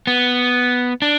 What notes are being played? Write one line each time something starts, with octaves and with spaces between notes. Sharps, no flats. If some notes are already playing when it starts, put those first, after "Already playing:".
B3
D4